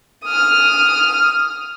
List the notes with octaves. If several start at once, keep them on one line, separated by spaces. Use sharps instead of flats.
D#6 F6